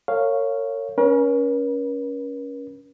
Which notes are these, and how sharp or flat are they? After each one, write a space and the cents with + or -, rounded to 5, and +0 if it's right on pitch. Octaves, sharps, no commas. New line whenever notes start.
A#4 -40 C#5 +0 F5 -5
C#4 +10 A#4 +45